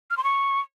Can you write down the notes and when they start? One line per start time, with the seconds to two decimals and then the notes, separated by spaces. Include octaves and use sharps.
0.11 F6
0.17 C6
0.24 C#6